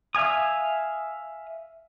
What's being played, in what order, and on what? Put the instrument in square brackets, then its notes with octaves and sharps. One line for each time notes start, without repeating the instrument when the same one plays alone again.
[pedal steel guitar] E5 F5 G#5 D#6